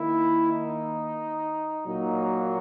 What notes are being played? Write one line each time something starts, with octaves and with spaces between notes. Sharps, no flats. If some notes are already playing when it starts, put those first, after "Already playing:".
Already playing: D#3 A#3 E4
D#4
A#2 F#3 A#3 D#4